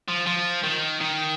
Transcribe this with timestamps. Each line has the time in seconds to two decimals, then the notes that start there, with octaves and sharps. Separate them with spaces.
0.09 F3
0.27 F3
0.64 D#3
1.01 D#3